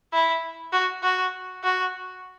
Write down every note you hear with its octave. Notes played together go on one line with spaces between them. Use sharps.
E4
F#4
F#4
F#4